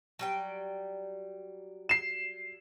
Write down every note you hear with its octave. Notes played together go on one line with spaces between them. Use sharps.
F#3 G3 G5
C7 E7